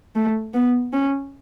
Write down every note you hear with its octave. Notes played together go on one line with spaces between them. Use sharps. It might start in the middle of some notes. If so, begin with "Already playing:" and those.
A3
B3
C#4